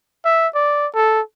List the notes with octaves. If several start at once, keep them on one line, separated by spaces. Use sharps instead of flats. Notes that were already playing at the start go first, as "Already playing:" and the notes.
E5
D5
A4